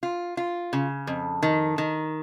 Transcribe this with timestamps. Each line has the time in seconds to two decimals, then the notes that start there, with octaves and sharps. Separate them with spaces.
0.03 F4
0.37 F4
0.73 C#3
1.07 F2
1.42 D#3
1.78 D#3